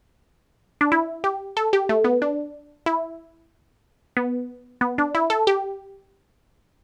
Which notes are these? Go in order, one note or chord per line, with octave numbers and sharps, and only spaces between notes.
D4
E4
G4
A4
G4
A3
B3
D4
E4
B3
B3
D4
E4
A4
G4